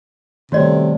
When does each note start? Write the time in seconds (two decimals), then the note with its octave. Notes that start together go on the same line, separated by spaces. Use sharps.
0.52 C3 D#3 G3 A3 B3 F#4 C#5 D5